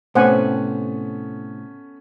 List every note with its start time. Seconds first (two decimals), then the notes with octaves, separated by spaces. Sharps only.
0.15 A2 C3 A3 B3 C#4 C5 F#5 G#5